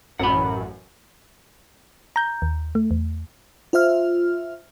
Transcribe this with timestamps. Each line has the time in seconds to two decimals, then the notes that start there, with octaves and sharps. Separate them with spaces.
0.19 A1 F#2 F#5 B5
2.16 A#5 G6
2.42 D#2
2.75 A3
2.91 E2
3.73 F4 C5 E5 F6